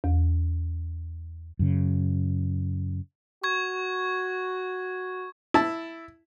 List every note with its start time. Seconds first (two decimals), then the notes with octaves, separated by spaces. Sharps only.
0.04 E2
1.59 F#2 C#3
3.44 F#4 C#6 G#6
5.54 E4 A5